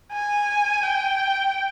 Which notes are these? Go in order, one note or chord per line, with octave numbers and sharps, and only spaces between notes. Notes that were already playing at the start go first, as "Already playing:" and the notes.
G#5
G5